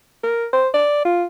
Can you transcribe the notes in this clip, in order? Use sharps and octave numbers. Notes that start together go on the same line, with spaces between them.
A#4
C5
D5
F4